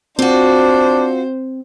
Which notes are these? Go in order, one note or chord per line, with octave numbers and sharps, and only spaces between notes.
C4 D4 F4 F#4 C5